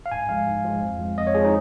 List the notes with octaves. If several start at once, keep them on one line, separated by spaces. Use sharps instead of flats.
F5
G#2 G#5
F3 G#3 F5
G#2
F3 G#3
F2
F3 G#3
F2 D#5
C#5
F3 G#3 G#4
D#4